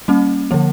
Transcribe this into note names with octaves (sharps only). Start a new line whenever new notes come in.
G3 A#3 C#4
D3 F3 A#3